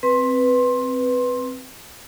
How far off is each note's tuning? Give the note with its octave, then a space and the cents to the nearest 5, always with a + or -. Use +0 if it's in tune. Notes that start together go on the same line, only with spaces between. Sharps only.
C4 +0 B4 +0 C6 +15